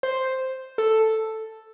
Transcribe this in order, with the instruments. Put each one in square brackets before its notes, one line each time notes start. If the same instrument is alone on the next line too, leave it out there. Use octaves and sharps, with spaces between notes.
[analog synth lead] C5
A4